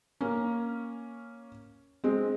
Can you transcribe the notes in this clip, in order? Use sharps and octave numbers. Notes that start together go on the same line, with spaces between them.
A#3 C#4
G#3 C4